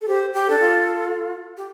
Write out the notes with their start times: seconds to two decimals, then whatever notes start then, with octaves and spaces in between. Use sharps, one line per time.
0.01 A4
0.08 G4 C5
0.33 G4
0.47 D4 A4
0.60 F4
1.57 G4